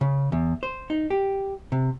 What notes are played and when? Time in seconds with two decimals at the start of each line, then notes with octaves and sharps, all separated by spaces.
0.01 C#3
0.32 E2
0.63 C5
0.90 D#4
1.10 G4
1.72 C3